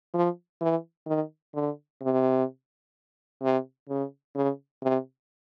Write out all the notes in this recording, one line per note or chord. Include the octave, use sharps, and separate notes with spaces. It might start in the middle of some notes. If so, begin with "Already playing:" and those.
F3
E3
D#3
D3
C3
C3
C#3
C#3
C3